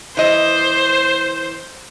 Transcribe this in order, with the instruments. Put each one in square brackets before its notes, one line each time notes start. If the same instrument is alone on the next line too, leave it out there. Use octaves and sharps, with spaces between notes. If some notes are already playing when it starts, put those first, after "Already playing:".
[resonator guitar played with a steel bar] E3 D#5 [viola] C5